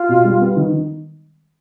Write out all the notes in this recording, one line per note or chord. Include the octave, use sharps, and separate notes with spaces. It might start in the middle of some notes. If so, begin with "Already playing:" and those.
Already playing: F4
B2
G3
B3
D#3
D#3